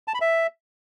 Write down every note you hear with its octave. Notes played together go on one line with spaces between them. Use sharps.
A5
B5
E5